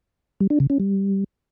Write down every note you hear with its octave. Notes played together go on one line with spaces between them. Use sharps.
G3
D4
C#3
C#4
G3